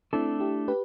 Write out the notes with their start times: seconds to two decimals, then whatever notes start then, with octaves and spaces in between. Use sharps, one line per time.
0.13 A3 C4 D4 E4 A4
0.40 E4 G4
0.68 G4 B4